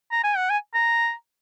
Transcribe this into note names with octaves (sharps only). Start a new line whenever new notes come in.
A#5
G#5
F#5
G#5
A#5